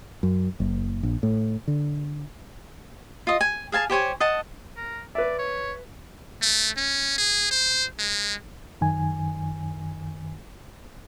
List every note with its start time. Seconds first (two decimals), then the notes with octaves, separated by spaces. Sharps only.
0.23 F#2
0.60 F#1
1.03 A#1
1.23 A2
1.68 D3
3.27 F4 D#5
3.41 G#5
3.72 G#4 F5 G#5 A5
3.90 G4 C5 C#5 G#5
4.20 D#5 F#5 A5
4.77 A#4
5.15 B4 D5 E5
5.39 C#5
6.42 A3
6.77 C#4
7.18 G#4
7.51 C5
7.99 G#3
8.81 F#2 D#3 G#5